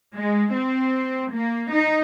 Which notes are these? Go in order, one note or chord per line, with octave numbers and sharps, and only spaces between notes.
G#3
C4
A#3
D#4